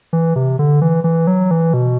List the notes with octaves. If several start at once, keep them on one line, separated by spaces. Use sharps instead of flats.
E3
C3
D3
E3
E3
F#3
E3
B2